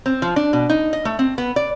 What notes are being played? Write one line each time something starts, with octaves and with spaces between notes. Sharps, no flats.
C4
F3
D4
B2
D#4
D#5
A3
C4
B3
D5